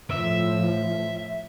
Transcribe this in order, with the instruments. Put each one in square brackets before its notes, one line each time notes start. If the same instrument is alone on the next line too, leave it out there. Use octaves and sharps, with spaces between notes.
[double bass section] A2 F3 [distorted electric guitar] E5